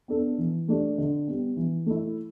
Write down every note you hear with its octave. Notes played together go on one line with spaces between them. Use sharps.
B3 D4 A4
E3
A3 D4 G4
D3
G3 B3
E3
A3 E4